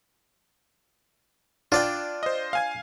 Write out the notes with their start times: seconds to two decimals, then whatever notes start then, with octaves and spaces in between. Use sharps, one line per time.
1.72 D4 F4 D5 G5
2.23 C5 D#5
2.53 F5 G#5 G#6